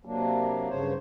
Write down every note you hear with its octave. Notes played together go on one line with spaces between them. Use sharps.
C3 F#3 A#3 D4
G2 C#3 C5 C#5